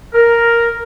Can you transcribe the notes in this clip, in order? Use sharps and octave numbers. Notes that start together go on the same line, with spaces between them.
A#4